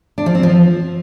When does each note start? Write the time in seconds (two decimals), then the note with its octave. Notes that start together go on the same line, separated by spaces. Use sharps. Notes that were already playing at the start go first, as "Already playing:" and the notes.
0.18 D4
0.26 F3
0.35 C4
0.43 F3